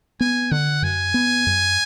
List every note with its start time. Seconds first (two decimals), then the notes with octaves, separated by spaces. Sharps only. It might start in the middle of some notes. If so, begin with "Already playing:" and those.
0.20 B3 G#5
0.51 D3 F#5
0.82 F#2 G#5
1.14 B3
1.47 F#2